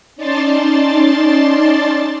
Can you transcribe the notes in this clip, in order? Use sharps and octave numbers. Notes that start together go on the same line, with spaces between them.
C#4 D#4 D5 A5 C6 A6